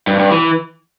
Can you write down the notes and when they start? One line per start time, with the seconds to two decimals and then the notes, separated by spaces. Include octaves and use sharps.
0.07 G2
0.19 G2
0.31 E3